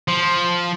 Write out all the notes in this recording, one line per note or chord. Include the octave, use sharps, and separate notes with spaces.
F3